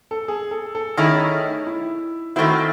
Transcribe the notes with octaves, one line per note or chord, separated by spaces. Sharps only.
A4
G#4
A4
A4
D#3 A3 C#4 E4 G#4
D#4
E4
D#3 A3 C4 E4 F#4